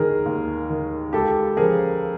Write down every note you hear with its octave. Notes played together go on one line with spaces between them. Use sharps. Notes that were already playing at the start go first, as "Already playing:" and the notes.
Already playing: D#2 D#3 G#4 A#4
D#2
D#3
C#2 G4 A4
C#3 F3 G#4 A#4